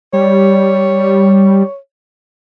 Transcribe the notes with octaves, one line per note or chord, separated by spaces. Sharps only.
G3 C#5